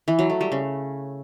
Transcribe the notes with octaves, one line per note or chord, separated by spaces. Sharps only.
E3
F#3
A3
G3
C#3